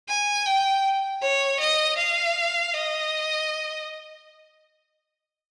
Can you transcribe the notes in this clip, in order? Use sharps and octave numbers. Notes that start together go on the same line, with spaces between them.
G#5
G5
C#5
D#5
F5
D#5